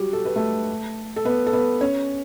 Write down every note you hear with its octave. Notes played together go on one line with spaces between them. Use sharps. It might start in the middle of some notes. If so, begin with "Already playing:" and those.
Already playing: F#3 G3 F#4 G4
A4
B4
A3 A4
A4
B3 B4
A4
B3 B4
C#4 C#5